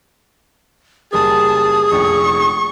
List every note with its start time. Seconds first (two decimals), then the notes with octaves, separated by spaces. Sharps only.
1.13 F#1 G3 G#4 A#4 A5 D#6
1.91 F1 A#1 F2 C#6